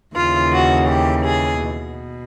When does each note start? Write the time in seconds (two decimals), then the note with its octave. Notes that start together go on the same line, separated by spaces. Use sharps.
0.16 D#2 C#3 E3 F4
0.53 F#4
0.89 G4
1.26 G#4
1.63 B2